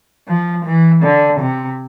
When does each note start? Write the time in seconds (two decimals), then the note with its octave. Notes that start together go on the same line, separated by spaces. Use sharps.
0.28 F3
0.65 E3
1.03 D3
1.40 C3